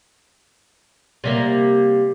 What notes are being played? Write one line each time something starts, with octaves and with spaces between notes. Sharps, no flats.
C3 G3 A#3